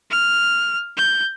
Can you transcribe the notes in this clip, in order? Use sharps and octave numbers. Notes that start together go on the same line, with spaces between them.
F6
G6